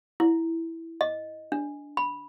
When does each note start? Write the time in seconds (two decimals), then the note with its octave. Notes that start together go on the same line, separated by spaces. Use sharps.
0.20 E4
1.01 D#5
1.52 D4
1.97 B5